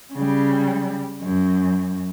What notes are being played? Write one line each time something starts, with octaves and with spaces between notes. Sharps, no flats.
C#3 G3
F#2